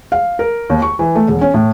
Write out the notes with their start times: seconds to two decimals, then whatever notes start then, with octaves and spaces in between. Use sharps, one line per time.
0.12 F5
0.39 A#4
0.70 D#2
0.82 C#6
0.99 E3
1.15 A3
1.28 E1
1.41 C#4
1.54 A2